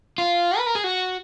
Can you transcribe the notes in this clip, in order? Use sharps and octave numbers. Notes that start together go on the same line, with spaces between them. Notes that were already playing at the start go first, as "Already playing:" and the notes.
F4
B4
A#4
G#4
F#4